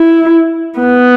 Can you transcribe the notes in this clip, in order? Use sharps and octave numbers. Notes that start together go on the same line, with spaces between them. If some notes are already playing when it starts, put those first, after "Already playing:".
Already playing: E4
B3